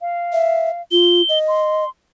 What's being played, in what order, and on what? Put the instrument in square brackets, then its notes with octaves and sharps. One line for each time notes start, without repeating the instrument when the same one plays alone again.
[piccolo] F5
[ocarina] E5
[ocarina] F4 [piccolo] G7
[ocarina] D#5
[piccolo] C6